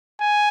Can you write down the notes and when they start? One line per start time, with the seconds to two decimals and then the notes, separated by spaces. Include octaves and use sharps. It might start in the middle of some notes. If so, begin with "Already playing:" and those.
0.20 G#5